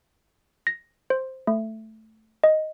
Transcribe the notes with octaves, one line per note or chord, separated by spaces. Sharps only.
A#6
C5
A3
D#5